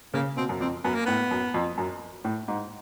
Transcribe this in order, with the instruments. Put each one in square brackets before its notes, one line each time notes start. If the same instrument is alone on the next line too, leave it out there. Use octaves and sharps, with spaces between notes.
[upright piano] C#3 [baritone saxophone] A#3
[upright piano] B2 [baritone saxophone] C4
[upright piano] F#2
[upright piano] F2 [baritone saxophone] C4
[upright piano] F#2 [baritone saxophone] B3
[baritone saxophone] A#3
[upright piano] A2 [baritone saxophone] B3
[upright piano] F#2
F2
F#2
A2
G#2